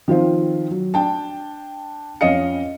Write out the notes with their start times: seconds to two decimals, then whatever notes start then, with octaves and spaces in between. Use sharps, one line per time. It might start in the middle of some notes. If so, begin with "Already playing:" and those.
0.08 D#3 F3 C4 F4
0.71 F#3
0.94 D4 G5 A5
2.21 F2 C#4 D#5 F5 C#7